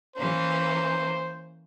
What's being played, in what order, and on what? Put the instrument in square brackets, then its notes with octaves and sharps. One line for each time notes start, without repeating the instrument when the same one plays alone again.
[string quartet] E3 A#3 C#4 [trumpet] C5